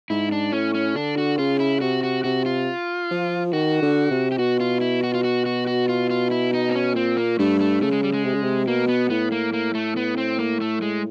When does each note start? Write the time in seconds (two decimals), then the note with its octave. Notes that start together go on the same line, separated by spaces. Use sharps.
0.10 G#2 E4
0.32 D4
0.52 A2 C#4
0.74 C#4
0.96 D3 D4
1.18 F#4
1.39 C#3 F4
1.60 E4
1.81 C3 F#4
2.03 F#4
2.24 C3 F#4
2.46 F4
3.11 F3
3.53 D#3 F#4
3.82 D3
4.11 C3
4.32 G4
4.38 B2 F#4
4.60 F4
4.81 E4
5.04 F#4
5.14 F4
5.24 F#4
5.46 F#4
5.67 F#4
5.89 F4
6.10 F4
6.31 E4
6.54 D#4
6.69 C4
6.75 C#4
6.96 A#2 C4
7.17 A#3
7.39 G2 A3
7.60 A3
7.82 C#3 A3
7.92 G#3
8.04 G3
8.14 G#3
8.25 C3
8.34 C#3
8.43 C3
8.67 B2 A#3
8.88 B3
9.10 A2 B3
9.32 A#3
9.53 A#3
9.75 A3
9.97 B3
10.18 C4
10.39 A#3
10.61 A3
10.82 G#3